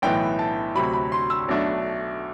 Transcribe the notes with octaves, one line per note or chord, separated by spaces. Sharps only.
B1 A2 E3 B3 G5
A5
D2 C3 F#3 B5
B5
C6
E6
B1 B2 A3 D4